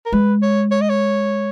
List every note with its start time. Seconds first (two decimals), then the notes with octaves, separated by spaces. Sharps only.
0.06 A#4
0.13 G#3 B4
0.42 C#5
0.71 C#5
0.81 D#5
0.89 C#5